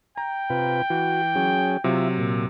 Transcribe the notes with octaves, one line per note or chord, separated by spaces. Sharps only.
G5 A#5
C3 F4 B4
E3 F#4
F#3 C#4 G#4
C3 F#3 F4 E5
A#2